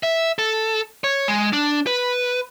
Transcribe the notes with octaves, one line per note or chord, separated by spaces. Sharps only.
E5
A4
C#5
G#3
D4
B4